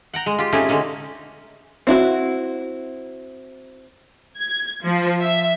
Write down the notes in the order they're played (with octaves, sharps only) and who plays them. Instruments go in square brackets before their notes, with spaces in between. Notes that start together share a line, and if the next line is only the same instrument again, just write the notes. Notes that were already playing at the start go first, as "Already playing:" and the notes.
[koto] F#5 G5 A#5
G#3
F4 G4
A3 C4 C#4 D#4 G4 G#4
D3 G#3 A#3 C#4 D#4
[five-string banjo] C4 E4 F#4
[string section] G#6
F3
E5